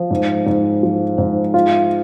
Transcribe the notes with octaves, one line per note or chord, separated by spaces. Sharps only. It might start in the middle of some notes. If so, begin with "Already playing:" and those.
Already playing: F3
G#2
G#2
F3
G#2
F4